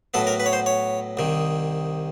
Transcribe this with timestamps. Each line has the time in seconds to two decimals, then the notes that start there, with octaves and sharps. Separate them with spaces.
0.14 A2 F#3 B3 A4
0.27 A#4
0.40 B4
0.46 C#5
0.53 C5
0.66 C#5
1.17 C2 C3 D#3